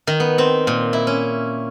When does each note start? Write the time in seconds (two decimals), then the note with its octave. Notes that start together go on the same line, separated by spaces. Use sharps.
0.07 D#3
0.20 B3
0.38 C4
0.67 A#2
0.93 E4
1.07 C#4